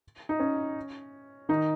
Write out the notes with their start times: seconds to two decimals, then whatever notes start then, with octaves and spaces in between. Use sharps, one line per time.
0.29 D#4
0.40 C#4
1.49 D#3 D#4